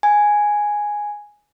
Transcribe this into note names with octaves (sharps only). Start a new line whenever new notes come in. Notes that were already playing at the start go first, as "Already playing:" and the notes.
G#5